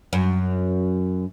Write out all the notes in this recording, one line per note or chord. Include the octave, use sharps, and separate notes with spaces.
F#2